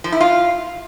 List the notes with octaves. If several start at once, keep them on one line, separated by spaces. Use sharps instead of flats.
F3
E4
F4